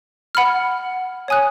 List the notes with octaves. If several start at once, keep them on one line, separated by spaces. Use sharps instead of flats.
F#5 B5 F6
C#5 G#5 D#6 F#6